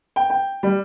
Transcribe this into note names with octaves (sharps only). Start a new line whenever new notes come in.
G5
G5
G3